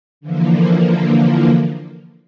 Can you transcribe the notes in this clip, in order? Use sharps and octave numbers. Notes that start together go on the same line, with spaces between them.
D3 E3 F3 A#3